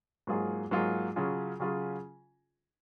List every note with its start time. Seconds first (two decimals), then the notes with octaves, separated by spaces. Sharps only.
0.27 G#2 F#3 A#3 F4 G#4
0.71 G#2 F#3 A#3 F4 G#4
1.16 C#3 F#3 C#4 F4 G#4
1.60 C#3 F#3 C#4 F4 G#4